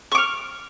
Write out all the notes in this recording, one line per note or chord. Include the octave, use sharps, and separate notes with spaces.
C#6 D6 F6